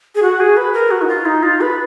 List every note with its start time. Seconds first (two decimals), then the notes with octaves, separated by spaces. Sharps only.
0.15 G#4
0.22 F#4
0.40 G#4
0.57 B4
0.74 A#4
0.91 F#4
1.02 D#4
1.08 F4
1.26 D#4
1.43 F4
1.61 B4